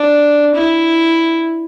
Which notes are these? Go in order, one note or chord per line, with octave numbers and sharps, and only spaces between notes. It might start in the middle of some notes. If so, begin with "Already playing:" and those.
Already playing: D4
E4